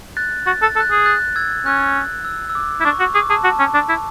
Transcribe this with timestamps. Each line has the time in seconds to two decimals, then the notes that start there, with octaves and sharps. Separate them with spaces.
0.17 F#6 A6
0.46 F#4 A6
0.62 A4 A6
0.76 A4
0.80 F#6 A6
0.91 G#4
1.06 F#6 A6
1.36 E6 G#6
1.66 C#4 F#6
2.25 E6
2.50 E6
2.55 D6
2.81 E4
2.85 D4 C#6
3.00 F#4 C#6
3.14 G#4 D6
3.30 G#4 A5
3.44 F#4 A5
3.59 C#4
3.74 D4
3.89 E4